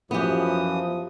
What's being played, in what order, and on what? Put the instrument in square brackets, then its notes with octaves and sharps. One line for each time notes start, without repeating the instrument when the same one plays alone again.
[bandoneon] F#2 E3 D#6 [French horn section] F3 [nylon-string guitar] B3 G4